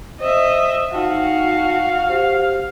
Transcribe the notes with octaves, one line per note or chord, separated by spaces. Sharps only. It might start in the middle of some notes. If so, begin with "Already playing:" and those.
C5 D#5 E5
D#4 F#4 F5 G5 A5
G4 C5